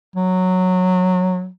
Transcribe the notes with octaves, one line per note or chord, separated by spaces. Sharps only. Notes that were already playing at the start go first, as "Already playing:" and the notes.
F#3